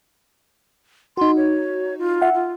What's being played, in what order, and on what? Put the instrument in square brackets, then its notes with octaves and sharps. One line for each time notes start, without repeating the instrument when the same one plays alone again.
[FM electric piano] D#4 F#4 [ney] C6
[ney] C#5
F4
[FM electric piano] E5 F#5
[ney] F4